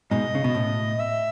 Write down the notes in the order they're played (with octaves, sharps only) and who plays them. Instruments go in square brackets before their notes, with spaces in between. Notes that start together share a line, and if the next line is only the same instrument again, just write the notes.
[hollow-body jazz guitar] G#2 B2 [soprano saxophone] D#5
[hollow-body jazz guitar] C#3
B2
A2
[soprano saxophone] E5